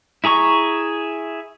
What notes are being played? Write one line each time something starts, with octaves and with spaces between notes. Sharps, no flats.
E4 G#4 A#5 C#6